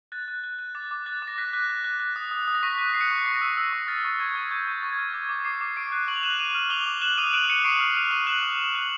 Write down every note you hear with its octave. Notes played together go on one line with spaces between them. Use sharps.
F#6 A6
F#6
F#6
F#6
D6 A6
D6
F#6 A6
D6
A#6
F#6 B6
F#6
F#6
F#6
F#6
D#6
D#6
D#6
A#6
C#6 B6
F#6
F#6 C7
C#7
C#6 C7
C#6 A#6
E6
E6
C#6
F6 A6
C#6
C#6 G#6
F6
C#6 G6
C#6 A6
C#6
G#6
F6
D6 G#6
D6
D6 C7
D6
C#6 C7 D7
F#6
C#6 F#7
F7
F#6 E7 F#7
D6 D#7 F7
F6
D6 F7 G7
D6
F#6 E7 F#7
D#6 D#7 F7
F#6 D7 E7
F#6 C#7 D#7
C#6 C7 D7
F6
F6 D#7 F7
C#6
F#6 E7 F#7
D#6
D#6
F#6 F#7